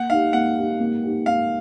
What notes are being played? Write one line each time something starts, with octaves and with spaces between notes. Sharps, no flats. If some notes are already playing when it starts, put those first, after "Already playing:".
Already playing: A#3 F#5
D#4 G4 F5
A#3 F#5
D#4 G4
A#3
D#4 G4
A#3 F5